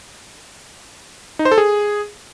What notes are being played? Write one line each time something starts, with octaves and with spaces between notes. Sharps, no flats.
D#4
C5
A4
G#4